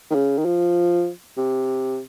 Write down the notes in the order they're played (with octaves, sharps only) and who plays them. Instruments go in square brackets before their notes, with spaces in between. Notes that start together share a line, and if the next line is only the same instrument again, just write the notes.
[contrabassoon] D#3
C#3
D#3
F3
C3